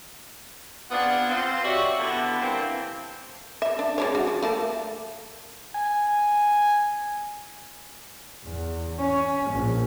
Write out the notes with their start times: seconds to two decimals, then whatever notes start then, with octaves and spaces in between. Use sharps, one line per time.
0.91 B3 C4 D4 F4 G#4 F#5
1.29 C4 F4 C5
1.64 F#4 G4 C#5 D5 E5
1.99 D3 B3 E4
2.41 G2 E3 A#3 C4
3.62 E5
3.79 D4
3.98 G#3 D4 C#5
4.15 F#4
4.27 F3
4.43 A3 A#3 A5
5.75 G#5
8.44 E2
8.99 C#4
9.51 A#1